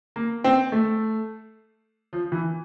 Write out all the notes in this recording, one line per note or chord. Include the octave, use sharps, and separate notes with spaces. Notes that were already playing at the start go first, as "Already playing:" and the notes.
A#3
C4
A3
F3
E3